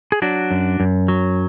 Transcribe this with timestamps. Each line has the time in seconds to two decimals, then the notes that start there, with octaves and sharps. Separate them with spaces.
0.12 G#4
0.22 F#3 D4 F#4
0.51 F#2
0.80 F#2
1.08 F#3